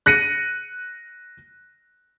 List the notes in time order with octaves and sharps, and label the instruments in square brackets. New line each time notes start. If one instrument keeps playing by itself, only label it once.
[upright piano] F#6 A#6 C#7 D#7